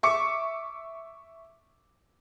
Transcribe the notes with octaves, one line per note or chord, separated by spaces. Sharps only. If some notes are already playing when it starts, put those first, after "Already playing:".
E5 C#6 D6 C#7